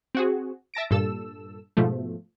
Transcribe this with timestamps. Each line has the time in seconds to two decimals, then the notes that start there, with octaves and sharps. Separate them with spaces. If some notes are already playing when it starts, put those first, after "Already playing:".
0.15 C4 F#4 G#4
0.74 E5 A5 A#6 D7
0.91 G2 A#2 A4 E6
1.77 G#2 B2 F3 A3